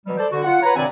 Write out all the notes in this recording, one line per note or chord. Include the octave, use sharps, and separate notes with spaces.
B2 E3 F#3 G3
A4 C5 D5
D3 F#4
F4 F#5
B4 C#5 A#5
G2 C3 D#3 C4 D5 G#5